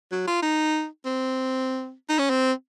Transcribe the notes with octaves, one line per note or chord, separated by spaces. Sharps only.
F#3
F4
D#4
C4
D#4
C#4
C4